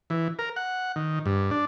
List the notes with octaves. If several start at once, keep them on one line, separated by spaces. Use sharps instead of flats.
E3
A#4
F#5
D#3
G2
D4